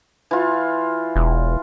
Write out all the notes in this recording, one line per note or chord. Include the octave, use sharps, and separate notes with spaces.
E3 F4
E1